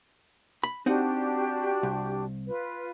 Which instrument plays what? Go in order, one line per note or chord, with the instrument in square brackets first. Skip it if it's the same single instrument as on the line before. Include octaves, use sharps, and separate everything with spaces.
[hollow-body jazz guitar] B5
[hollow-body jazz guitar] C4 D#4 F#5 [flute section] D4 F#4 G4
[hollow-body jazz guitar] C2
[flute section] F4 B4